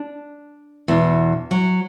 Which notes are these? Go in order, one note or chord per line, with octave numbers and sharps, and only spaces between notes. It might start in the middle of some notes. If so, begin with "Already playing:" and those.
Already playing: D4
E2 B2
F#3